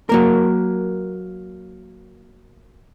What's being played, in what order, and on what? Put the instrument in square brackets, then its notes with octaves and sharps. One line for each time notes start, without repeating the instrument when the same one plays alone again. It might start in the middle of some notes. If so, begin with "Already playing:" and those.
[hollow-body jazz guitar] F#3 A#3 A#4